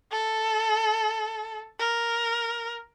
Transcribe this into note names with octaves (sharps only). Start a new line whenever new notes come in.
A4
A#4